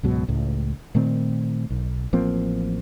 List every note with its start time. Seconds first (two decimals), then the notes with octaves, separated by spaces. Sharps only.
0.03 C#2 G#2 B2 F#3
0.28 C#2 A2
0.95 A#2 D#3 A3 C4
1.70 B1
2.13 A1 F3 A#3 C4